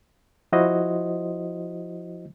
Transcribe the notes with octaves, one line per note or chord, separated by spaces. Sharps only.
F3 E4 F#4 C5 D#5